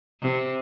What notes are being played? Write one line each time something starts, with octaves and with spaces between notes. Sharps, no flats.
C3